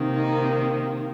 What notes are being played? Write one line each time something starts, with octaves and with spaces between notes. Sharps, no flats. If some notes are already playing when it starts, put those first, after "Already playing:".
Already playing: C3 D#3 A#3
D#4